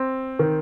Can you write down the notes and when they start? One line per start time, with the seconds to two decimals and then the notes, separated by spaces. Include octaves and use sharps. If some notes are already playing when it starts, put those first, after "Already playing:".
Already playing: C4
0.39 D#3